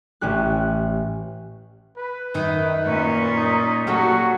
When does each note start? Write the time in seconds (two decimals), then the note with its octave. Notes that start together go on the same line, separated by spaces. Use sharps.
0.21 A1 C#4 G4 F#6
1.98 B4
2.34 F#2 D#3
2.86 A#2 C#4
3.37 D#4
3.87 A#2 F#3 C#4 F#4 G4 A4